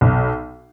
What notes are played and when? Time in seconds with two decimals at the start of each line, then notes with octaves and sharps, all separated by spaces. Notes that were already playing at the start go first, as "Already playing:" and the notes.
0.01 B1